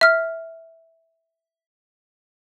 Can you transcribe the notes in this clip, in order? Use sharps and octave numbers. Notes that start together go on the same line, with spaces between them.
E5 F6